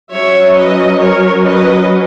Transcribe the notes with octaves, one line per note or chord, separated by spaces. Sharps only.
F#3 C#4 C#5 E5
B4 D#5
A#4 C#5
B4 D#5